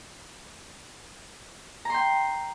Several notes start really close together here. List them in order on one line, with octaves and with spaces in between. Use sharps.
A#5 C6 G5